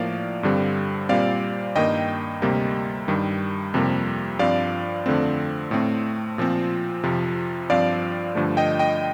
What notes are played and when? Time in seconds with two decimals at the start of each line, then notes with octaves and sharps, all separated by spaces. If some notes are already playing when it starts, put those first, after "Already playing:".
Already playing: A2 F3 A#3 D5 F5
0.43 G2 D3 G3 C4
1.09 A#2 G3 C4 D5 F5
1.76 G2 D#3 A#3 D#5 G5
2.42 D2 C3 G3 A#3
3.08 G2 D#3 G3
3.74 F2 C3 G3 A#3
4.39 G2 F3 C4 D5 F5
5.06 F2 D3 A3 C4
5.71 A2 A3 C4
6.38 A#2 F3 C4
7.03 F2 C3 F3
7.69 G2 F3 C4 D5 F5
8.35 G2 D3 F3 A3
8.57 D#5 G5
8.79 D#5 G5